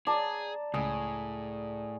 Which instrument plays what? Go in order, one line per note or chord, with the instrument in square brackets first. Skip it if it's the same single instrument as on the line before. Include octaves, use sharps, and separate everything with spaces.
[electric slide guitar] G#4 [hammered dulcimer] D5 A5 A#5
[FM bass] C#2 [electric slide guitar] A2 [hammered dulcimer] G#4